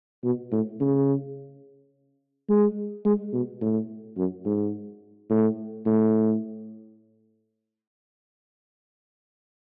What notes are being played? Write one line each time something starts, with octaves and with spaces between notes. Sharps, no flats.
B2
A2
C#3
G#3
G#3
B2
A2
F#2
G#2
A2
A2